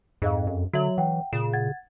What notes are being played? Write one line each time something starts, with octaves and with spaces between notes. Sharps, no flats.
F2 G#2 G#4 D#5 F5
F#2
D3 F#3 F#4 E5 F#7
E3 F#5 G5
A#2 C#3 E7
F#5 G#6 A6